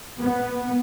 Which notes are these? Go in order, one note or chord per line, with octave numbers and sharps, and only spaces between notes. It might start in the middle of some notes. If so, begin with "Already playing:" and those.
B3